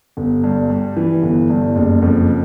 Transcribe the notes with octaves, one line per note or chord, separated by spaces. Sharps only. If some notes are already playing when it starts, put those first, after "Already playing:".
G1
G2
G3
E3
G1
G2
F#1
F2